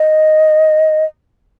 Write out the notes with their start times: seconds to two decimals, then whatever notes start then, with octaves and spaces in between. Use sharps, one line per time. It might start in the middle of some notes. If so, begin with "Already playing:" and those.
Already playing: D#5